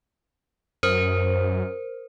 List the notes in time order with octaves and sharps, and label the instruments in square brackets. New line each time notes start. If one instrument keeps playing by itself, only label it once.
[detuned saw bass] F#2 [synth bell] A#4 C5